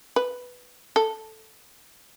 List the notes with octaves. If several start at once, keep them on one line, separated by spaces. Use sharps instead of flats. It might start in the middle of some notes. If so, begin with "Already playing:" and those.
B4
A4